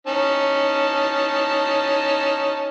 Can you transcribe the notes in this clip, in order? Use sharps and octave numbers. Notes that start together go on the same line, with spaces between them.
C#4 D#4 A5